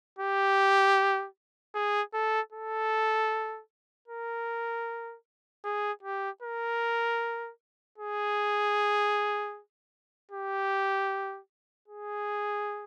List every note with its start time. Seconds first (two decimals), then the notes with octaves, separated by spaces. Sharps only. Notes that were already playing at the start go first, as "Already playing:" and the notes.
0.19 G4
1.75 G#4
2.14 A4
2.52 A4
4.08 A#4
5.65 G#4
6.03 G4
6.42 A#4
7.98 G#4
10.32 G4
11.88 G#4